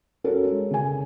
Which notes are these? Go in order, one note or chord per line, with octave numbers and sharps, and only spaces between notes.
C#4 F#4 A4 A#4
G#3
C#3 G#5